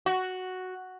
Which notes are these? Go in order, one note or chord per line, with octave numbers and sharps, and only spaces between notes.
F#4